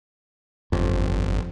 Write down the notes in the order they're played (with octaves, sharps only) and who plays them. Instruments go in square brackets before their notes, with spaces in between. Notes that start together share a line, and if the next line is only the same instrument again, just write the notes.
[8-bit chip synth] G1 [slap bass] F2